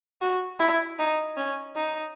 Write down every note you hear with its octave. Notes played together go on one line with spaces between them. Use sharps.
F#4
E4
D#4
C#4
D#4